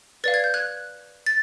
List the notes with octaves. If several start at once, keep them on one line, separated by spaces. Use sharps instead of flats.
B4 D5 F5 A6
G#6
G6
F#6 G#6
A6